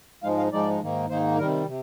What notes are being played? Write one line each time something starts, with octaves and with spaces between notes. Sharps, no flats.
G#2 F3 G#3 D#4 F5
F5
G#2 F3 G#3 D#4 D5
G#2 D#3 A#3 D#4
G#2 D#3 A#3 D#4 C5
C3 D#3 G3 A#4
C3